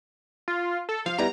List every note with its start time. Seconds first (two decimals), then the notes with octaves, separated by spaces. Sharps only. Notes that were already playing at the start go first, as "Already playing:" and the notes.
0.48 F4
0.89 A4
1.06 F3 F5
1.19 G3 B3 E4 A#5